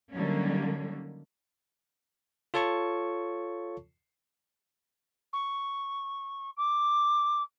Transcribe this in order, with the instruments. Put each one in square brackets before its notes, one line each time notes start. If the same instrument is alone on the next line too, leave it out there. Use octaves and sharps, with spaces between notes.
[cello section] D3 D#3 F#3 G3 A#3 C#4
[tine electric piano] F4 A4 C#5 A5 C#6
[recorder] C#6
D6